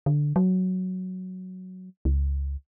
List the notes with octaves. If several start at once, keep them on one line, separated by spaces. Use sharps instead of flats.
D3
F#3
C#2